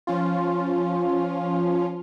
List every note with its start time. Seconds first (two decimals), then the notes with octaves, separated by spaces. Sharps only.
0.07 F3 C#4 F4